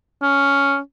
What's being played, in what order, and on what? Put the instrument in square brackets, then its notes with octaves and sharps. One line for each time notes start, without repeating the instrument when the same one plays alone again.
[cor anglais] C#4